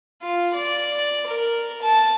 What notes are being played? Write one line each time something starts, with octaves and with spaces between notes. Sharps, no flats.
F4
D5
A#4
A5